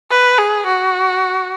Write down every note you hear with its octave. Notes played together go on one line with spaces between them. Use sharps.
B4
G#4
F#4